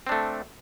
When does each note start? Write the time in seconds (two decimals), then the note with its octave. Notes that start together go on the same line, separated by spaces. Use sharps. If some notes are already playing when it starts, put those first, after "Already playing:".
0.07 C4
0.09 D4
0.12 A3